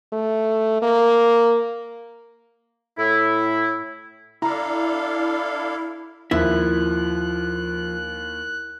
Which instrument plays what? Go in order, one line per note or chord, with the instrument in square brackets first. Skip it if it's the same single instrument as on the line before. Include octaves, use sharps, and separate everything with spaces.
[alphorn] A3
A#3
[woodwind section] A2 E4
[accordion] D4 A4 F5 [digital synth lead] E4 [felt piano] A#5
[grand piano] D#2 [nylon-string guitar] F3 [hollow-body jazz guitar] E4 E5 [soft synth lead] F#6